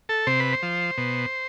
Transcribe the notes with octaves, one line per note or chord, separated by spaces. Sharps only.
A4
C3 C5
B4
C5
F3
B2